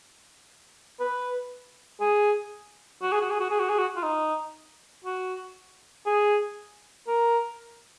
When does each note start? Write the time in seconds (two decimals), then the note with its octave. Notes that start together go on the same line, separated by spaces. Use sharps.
1.00 B4
2.01 G#4
3.02 F#4
3.12 G#4
3.21 F#4
3.31 G#4
3.40 F#4
3.50 G#4
3.60 F#4
3.69 G#4
3.79 F#4
3.96 F4
4.03 D#4
5.05 F#4
6.06 G#4
7.07 A#4